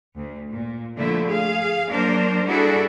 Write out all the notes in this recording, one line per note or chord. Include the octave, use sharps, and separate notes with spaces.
D2
A#2
D3 F3 A3 A#3 E4
G#4 F5
F#3 A#3 D4 A#4 C5
G3 D4 E4 F#4 G#4 A4